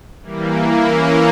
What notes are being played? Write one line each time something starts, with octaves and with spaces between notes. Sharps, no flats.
E3 G3 A#3
E3 A#3 E4
E3 A#3 C#4